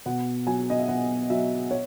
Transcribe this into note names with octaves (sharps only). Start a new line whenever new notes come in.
B2 F#5
F#3 G#5
D#5
E5
B2 F#5
F#3 E5
C#5